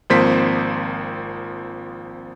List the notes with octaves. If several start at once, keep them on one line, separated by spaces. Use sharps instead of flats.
G#1 F3 A#3 C4 C5 B6